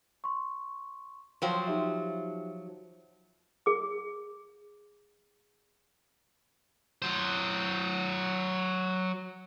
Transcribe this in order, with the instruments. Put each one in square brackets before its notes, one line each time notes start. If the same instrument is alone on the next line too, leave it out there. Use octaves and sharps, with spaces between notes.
[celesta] C6 C#6
[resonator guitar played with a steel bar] F3 F#3 C5 [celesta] F5 G5 C6
[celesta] D#4 G4 E5
[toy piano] G#4 D6
[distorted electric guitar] F#3 C5